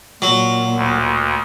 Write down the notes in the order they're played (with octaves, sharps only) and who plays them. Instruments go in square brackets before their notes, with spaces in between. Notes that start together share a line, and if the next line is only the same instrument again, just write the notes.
[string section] A#2 [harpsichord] F#3
[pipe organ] D2